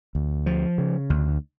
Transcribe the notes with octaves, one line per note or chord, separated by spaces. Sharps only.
D2
F3
C#3
D2